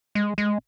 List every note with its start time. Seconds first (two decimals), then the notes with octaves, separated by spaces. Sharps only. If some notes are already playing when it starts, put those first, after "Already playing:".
0.15 G#3
0.38 G#3